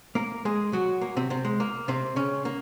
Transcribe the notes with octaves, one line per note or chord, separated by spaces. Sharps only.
A#3 A#4
G#3 G#4
F#3 F#4
A#3
C3 C4
C3 C4
G#3
A#3
C3 C4
C#3 C#4
A#3